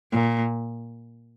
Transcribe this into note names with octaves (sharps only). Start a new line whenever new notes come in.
A#2